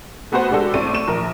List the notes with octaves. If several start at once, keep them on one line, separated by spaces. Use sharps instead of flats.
A3 B3 F#4 B4 C5 F#5
G#3 D4 F#4 G4 A4
A2 A3 C4 D5 D#7
A3 C#6 E7
A#1 A#4